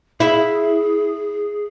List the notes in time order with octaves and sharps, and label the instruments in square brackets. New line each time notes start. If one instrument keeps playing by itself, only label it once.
[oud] E4 [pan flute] G#4